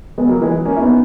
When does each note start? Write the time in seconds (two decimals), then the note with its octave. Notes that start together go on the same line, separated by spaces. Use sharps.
0.18 G#3 B3
0.29 F#3 A#3
0.41 E3 G#3
0.65 A#3 C#4
0.77 E4
0.82 B3 D#4